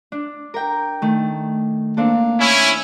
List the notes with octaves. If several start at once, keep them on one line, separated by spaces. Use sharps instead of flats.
D4
A#4 G5
D#3 A3
A#3 C4 D4 A4
C#4 E4